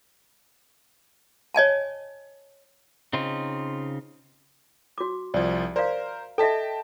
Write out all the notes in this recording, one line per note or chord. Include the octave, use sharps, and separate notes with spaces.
C#5 D#5 G#5 A5
C#3 C4 D#4 F4
F#4 D6
C2 F3 D5
A#4 C5 D5 F5
A4 D#5 E5 G5 A5 B6